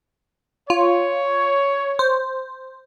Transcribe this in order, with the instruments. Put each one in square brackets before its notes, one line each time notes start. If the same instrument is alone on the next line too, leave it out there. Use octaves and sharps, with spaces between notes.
[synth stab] F4 [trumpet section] C#5
[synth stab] C5